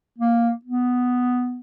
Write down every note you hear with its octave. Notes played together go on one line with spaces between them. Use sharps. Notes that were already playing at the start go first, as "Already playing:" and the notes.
A#3
B3